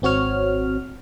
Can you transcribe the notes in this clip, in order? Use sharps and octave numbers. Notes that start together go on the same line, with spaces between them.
G#1 C4 F#4 C#5 F6